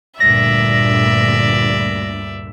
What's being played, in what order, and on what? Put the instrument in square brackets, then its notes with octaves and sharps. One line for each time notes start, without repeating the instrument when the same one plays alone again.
[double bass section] D2 G2 A#2 [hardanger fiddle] D5 E5 [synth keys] A#6